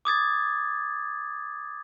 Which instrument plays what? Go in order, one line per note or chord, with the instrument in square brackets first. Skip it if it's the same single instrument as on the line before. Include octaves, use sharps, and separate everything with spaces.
[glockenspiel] D6 D#6 G#6 A6